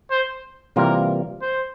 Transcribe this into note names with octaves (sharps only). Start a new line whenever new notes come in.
C5
C3 E3 G3 A#3 F4 A#4
C5